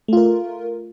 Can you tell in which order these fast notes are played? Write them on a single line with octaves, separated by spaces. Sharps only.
A3 F4 A#4